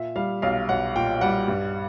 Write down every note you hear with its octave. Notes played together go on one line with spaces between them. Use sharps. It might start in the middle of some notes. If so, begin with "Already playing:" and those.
Already playing: A#2 E5
G3 F5
B1 F5
B1 F#5
A#2 G5
G3 F#5
G2